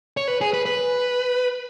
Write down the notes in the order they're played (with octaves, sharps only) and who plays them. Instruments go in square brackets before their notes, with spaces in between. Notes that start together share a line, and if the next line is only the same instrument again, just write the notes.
[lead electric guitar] C#5
B4
G#4
B4
B4